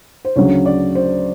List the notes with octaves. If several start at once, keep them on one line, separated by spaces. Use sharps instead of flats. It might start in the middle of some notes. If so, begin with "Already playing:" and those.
C5
D2 C#3 F#3 C#5
D5
C5